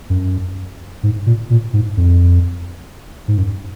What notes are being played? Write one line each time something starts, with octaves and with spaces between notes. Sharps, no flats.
F#2
G#2
A#2
A#2
G#2
F2
G#2
F#2